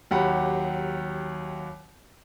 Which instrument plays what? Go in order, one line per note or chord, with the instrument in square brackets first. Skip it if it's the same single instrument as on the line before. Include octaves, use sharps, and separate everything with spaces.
[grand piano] D#2 F#3 G4 F#5 B5